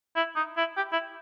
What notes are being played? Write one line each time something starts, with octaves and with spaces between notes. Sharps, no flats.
E4
D#4
E4
G4
E4